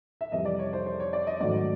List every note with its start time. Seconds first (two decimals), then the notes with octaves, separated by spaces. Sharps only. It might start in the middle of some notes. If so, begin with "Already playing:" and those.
0.21 E5
0.32 F2 C3 E3 G3 D#5
0.45 D5
0.59 C#5
0.73 C5
0.86 C5
1.00 C#5
1.13 D5
1.27 D#5
1.40 G#2 D#3 F#3 A3 D5